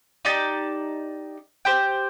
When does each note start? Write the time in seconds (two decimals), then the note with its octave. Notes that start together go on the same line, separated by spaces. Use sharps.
0.25 D#4 G4 D5 A5
1.65 G4 C5 G5